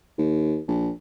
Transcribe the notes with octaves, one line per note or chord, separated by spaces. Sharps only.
D#2
A#1